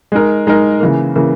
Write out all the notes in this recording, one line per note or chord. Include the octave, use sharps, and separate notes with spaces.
G#3 D#4 A#4
G#3 D#4 A#4
C#3 E3 A#3
C#3 E3 A#3